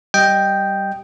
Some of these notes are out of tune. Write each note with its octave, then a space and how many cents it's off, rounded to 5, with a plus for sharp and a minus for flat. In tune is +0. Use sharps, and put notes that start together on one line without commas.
G3 -15 D#5 +0 G5 +0